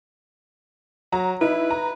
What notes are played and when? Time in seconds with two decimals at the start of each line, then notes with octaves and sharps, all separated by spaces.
1.12 F#3 A#5
1.41 D#4 E4 B4
1.71 A#5